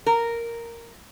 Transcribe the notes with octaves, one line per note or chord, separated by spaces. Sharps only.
A#4